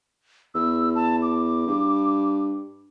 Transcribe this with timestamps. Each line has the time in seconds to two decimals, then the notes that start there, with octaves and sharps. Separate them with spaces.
0.55 E2 E6
0.95 A5
1.22 D6
1.67 G2